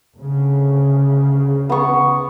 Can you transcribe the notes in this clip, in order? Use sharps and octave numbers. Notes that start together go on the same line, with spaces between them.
D2 C#3
B3 C#6